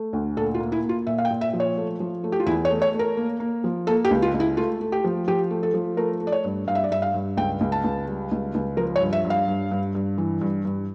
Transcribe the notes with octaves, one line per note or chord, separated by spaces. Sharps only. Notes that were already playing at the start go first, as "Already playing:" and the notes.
Already playing: A3
D2
A#2 A4
F4
A#3
E4
A#3
F4
A#2 E5
F5
G5
A#2
E5
F3
C#5
A3
F3
A3
G4
F4
E2 E4
C#5
A3
C#5
A3
A#4
A#3
A#3
F3
A#3 A4
G4
C#2
F4
C#2
E4
A3 F4
A3
G4
F3
F3 G4
A3
A4
F3
A3 A#4
A3
D5
C#5
G2
G2 F5
E5
D5
G2 E5
F5
G2
C#2 G5
C#2
A5
C#2
G3
C#2
C#2
F3 A#4
C#5
G2
E5
G2
F5
G2
G2
G2
E3
G2
G2